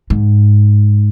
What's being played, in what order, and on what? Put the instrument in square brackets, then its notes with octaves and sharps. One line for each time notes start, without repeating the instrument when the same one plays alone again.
[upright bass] G#2